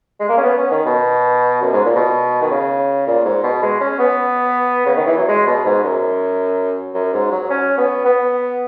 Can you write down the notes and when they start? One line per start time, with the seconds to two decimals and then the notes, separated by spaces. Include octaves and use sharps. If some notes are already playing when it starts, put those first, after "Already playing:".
0.20 G#3
0.29 A#3
0.37 C#4
0.43 B3
0.58 C#4
0.71 D#3
0.85 B2
1.62 F#2
1.73 G#2
1.85 A#2
1.96 B2
2.41 D#3
2.51 C#3
3.07 A#2
3.25 G#2
3.43 B2
3.62 G#3
3.80 C#4
3.99 B3
4.86 C#3
4.96 D#3
5.07 E3
5.17 F#3
5.28 G#3
5.47 B2
5.65 G#2
5.84 F#2
6.94 F#2
7.13 G#2
7.31 F#3
7.50 C#4
7.78 B3
8.05 B3